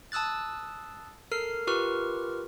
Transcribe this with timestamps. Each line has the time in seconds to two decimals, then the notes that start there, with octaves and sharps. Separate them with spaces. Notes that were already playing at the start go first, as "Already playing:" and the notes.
0.12 A5 D#6 E6 F#6 A6
1.31 A4 A#4 F6 C7
1.67 F4 G4 A#4 B4 C#6 F6